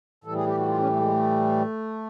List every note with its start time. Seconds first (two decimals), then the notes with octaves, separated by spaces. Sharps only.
0.24 A2 E3 G3 A4
0.35 G#4
0.46 G4
0.57 F#4
0.68 F4
0.78 C#4
0.84 G#3
0.89 A3
1.00 G#3
1.11 A3